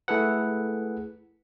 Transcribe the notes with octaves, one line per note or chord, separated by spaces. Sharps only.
A3 E4 G#4 A4 B4 F#5